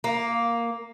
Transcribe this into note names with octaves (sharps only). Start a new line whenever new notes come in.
A#3